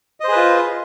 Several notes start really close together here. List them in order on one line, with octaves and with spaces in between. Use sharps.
D#5 C5 G#4 B4 F4